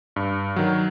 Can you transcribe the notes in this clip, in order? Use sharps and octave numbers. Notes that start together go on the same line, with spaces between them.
G2
D#3 F#3